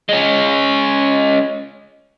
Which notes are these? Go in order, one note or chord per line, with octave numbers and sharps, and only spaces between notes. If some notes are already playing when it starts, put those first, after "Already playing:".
G#3 C#4